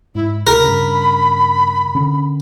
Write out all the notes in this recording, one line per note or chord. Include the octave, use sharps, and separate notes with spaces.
G#2 E4
C#2 A#4 B5
G2 C#3
D3 C#4